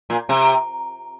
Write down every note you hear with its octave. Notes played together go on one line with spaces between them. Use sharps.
A#2
C3